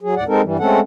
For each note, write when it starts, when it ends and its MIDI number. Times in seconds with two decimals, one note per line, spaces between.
0.01 0.14 54
0.01 0.14 68
0.16 0.24 39
0.16 0.24 45
0.16 0.24 74
0.16 0.24 78
0.27 0.41 56
0.27 0.41 60
0.27 0.41 63
0.27 0.41 69
0.27 0.41 70
0.43 0.57 43
0.43 0.57 52
0.43 0.57 55
0.59 0.80 56
0.59 0.80 57
0.59 0.80 60
0.59 0.80 61
0.59 0.80 69
0.59 0.80 78